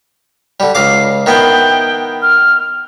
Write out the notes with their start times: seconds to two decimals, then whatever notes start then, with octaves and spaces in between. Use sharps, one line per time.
0.60 D3 G3
0.75 C#2 F5 D6 C7
1.26 D#3 B3 E4 G5
2.22 F6